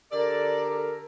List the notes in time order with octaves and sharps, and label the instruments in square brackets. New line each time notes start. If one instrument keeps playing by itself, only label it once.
[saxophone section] D3 G4 A4 [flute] A#4 [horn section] D5